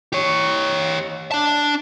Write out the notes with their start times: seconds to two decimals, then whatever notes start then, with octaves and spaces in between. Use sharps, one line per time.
0.12 G4 C#5
1.31 D4 A5